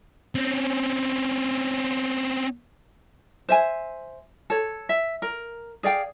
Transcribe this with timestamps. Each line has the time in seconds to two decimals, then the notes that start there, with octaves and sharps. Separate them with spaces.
0.35 C4 C#4
3.49 C5 E5 G#5
4.50 A4 C#5
4.89 E5
5.22 A#4
5.83 G#4 D5 F5 G5